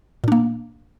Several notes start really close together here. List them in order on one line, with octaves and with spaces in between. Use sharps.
A#2 D4 A#3